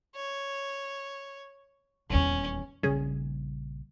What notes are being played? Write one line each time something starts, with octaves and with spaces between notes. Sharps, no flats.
C#5
D#1 E2 C#4
A#1 C#3 G3 C#4 G#4